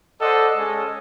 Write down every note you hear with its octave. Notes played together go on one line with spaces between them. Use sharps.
A4 C5 D5 D#5 F#5
G#3 C#4 A4 D#5